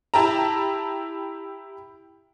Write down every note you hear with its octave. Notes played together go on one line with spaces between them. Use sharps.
E4 G4 A5 A#5